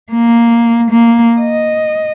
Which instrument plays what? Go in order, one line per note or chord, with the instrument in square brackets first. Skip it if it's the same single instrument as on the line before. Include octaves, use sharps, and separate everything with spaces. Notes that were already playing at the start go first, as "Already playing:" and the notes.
[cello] A#3
A#3
D#5